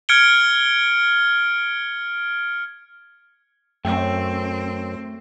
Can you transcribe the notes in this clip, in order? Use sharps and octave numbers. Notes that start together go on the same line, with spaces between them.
F6 G#6 C#7 D7 G7
F#2 A3 C4 G5